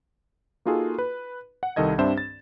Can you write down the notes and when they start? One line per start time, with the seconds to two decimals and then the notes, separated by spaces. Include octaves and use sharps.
0.66 A#3 D#4 F4 F#4 G#4 A4
0.98 B4
1.63 F#5
1.76 C2 D#3 A4 D#5 G#6
1.98 G2 C4 D4 C5 E5 E7
2.18 A6